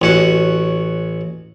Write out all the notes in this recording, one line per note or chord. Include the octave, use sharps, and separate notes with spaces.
A1 C#4 F#4